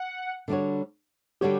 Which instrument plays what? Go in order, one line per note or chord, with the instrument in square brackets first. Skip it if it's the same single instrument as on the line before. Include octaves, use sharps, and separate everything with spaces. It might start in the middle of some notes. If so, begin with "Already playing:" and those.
Already playing: [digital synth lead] F#5
[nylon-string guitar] D3 G3 D4 F#4 C#5
[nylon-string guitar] D3 G3 D4 F#4 C#5 [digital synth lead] G4